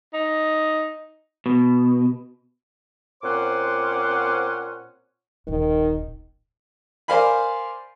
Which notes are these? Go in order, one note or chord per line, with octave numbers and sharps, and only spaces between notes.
D#4
B2
A#2 C4 C#4 C5 F#5 D6
D#1 A#1 D#3
A#4 C5 D5 F5 G#5 B5